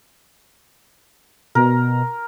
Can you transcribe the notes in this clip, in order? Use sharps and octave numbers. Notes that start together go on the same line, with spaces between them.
B2 A#4